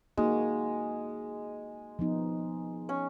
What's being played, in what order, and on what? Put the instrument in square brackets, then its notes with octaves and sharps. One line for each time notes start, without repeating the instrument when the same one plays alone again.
[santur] G#3 [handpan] A#3 D#4 F#4
[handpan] F3 B3 D#4
[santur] C#4